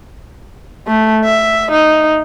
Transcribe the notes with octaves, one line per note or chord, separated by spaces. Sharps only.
A3
E5
D#4